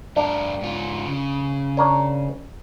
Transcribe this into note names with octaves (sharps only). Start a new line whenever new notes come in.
G2 D4 A#4
G#2 F4
C#3
D4 A#4 C#5